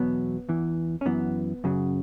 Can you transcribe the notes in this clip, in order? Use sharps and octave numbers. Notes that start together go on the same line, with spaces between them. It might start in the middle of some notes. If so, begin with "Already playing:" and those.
Already playing: E2 B2 F#3 B3
E2 E3
C#4
F#2 E3 B3
F#2 C#3 F#3